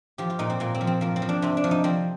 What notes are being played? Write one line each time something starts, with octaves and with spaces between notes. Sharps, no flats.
F3 G4
F4
A#2 D#4
C4
A#2 A#3
C4
F3
C4
F3 A#3
C4
F3
D4
C3 C4
D4
F3
D#4
F3 C4